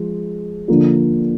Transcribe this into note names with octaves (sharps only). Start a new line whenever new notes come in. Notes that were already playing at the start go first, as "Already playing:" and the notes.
Already playing: F3 G#3
D3 F3 A#3 F4